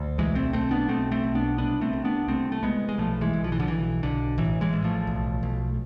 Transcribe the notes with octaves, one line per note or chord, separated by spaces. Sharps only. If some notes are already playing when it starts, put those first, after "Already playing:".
Already playing: D2
B1 E3 G#3
A3 C4
B1 A3 C4
B3 D4
B1 A3 C4
A3 C4
B1
B3 D4
C2 B3 D4
A3 C4
C2
B3 D4
C2 A3 C4
A3
C2 G#3 B3
G#3
B1 F3 A3
E3 G#3
B1
F3
E3
D3 F3
B1 E3
B1 D3
A1 E3
E3 G#3
A1
F3 A3
B1
B1